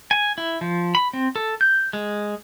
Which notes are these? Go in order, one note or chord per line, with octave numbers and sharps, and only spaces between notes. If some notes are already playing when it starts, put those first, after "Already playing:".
G#5
E4
F3
B5
C4
A4
G6
G#3